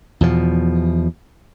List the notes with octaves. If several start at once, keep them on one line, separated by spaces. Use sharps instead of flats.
E2 B2 F3